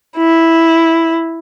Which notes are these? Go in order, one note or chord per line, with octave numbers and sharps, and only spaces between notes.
E4